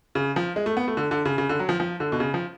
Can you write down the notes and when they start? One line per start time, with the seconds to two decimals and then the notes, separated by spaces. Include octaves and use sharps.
0.15 C#3
0.36 F3
0.56 G#3
0.66 A3
0.77 B3
0.88 A3
0.97 D3
1.11 D3
1.25 C#3
1.38 C#3
1.49 D3
1.59 F#3
1.69 F3
1.80 F3
2.00 D3
2.12 B2
2.20 C#3
2.34 F3